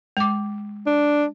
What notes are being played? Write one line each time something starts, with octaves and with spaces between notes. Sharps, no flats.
G#3 D6
D4